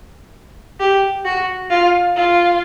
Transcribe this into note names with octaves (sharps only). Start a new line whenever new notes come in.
G4
F#4
F4
F4